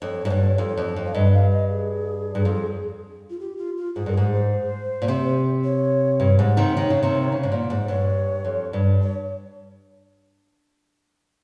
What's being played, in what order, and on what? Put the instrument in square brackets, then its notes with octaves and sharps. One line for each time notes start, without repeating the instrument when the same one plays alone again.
[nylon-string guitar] F2 [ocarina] C#5
[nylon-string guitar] G#2
G2
F2
F2
F2
[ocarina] F5
[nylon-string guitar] G2 [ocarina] D#5
[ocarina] F5
D#5
G#4
[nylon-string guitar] G2
F2
[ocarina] F4
G4
F4
F4
[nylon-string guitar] G#2 [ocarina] G#4
[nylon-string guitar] G2 [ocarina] A#4
[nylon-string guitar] G#2 [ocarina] G#4
[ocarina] C5
[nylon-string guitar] A#2
C3
[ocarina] C#5
[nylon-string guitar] G2
G#2
C3 D#3
[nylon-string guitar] D#3 [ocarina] C#5
[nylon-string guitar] C#3
C3 D#3
C#3
G#2
A#2
G#2
[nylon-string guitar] G2 [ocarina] C#5
[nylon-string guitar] F2
G2
[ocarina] C#5